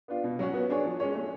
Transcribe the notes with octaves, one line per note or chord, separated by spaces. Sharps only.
B3 D4 F4
B2
F#3 C#4 F#4
B3
D4 G#4 C#5
F3
G#3 C#4 G#4 C#5
A3